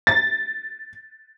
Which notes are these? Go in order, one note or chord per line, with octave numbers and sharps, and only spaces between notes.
A6